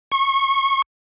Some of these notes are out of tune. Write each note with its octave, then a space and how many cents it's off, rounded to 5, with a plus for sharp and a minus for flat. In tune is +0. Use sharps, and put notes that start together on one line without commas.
C#6 -25